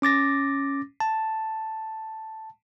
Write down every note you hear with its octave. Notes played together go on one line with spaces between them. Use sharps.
C#4 D6 A6 A#6
A5